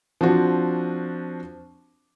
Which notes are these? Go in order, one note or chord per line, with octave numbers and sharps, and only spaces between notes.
F3 C4 D4 F#4